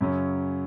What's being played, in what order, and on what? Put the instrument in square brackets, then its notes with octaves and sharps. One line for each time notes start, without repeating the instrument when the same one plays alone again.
[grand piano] F#2 C#3 F#3 C#4